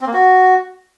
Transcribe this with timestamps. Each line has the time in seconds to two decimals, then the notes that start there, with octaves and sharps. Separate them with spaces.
0.01 C4
0.07 A#3
0.13 F#4